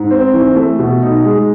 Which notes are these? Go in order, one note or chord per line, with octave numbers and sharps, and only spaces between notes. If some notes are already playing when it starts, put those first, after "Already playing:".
Already playing: G#2
C4
E3
A3
B2
D#4
G#3